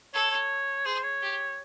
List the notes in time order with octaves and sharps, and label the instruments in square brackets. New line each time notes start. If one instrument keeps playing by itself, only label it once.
[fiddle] A4 [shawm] C#5
[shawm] C#5
[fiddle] G#4 [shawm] C5
[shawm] C#5
[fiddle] G4